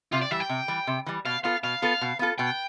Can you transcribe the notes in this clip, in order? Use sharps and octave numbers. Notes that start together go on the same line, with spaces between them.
C3 F4
D5
E3 G3 E5
G5
C3
E3 G3
C3
E3 G3
B2 F5
B3 F4 A4 F5
B2 F5
B3 F4 A4
B2
B3 F4 A4
B2 G5